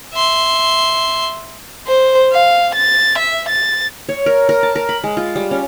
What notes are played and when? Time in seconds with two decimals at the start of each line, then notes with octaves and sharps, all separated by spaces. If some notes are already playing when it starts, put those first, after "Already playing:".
0.14 E5 C6
1.87 C5
2.32 F5
2.75 A6
3.18 E5
3.49 A6
4.09 C#5
4.26 A#4
4.49 A#4
4.63 A5
4.76 A#4
4.89 B5
5.04 G#3
5.17 F4
5.36 G3
5.51 C#4